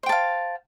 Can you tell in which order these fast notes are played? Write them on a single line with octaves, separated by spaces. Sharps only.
C5 G5 A5 F5